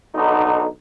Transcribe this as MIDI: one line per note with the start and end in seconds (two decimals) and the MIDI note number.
0.15 0.66 35
0.15 0.66 50
0.15 0.66 63